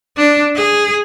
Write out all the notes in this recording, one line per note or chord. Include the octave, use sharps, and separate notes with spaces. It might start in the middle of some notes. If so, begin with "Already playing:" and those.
D4
G#4